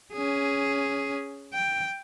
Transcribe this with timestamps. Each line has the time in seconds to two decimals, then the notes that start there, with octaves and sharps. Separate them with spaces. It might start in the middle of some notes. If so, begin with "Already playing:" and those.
0.13 C#4 G#4
1.53 G5